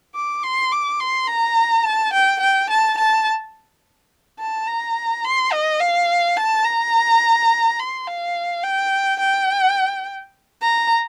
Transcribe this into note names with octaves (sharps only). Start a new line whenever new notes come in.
D6
C6
D6
C6
A#5
A5
G5
G5
A5
A5
A5
A#5
C6
D#5
F5
A5
A#5
C6
F5
G5
G5
A#5